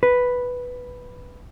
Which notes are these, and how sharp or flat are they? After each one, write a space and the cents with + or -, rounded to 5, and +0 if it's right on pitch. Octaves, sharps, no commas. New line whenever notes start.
B4 +0